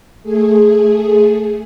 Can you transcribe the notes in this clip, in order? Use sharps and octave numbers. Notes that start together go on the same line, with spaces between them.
A3 G#4